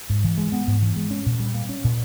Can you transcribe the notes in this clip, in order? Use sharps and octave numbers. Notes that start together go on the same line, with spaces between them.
G#2
E3
G#3
B3
G#2
E3
G#3
C#4
A#2
G3
A#3
C#4
A#2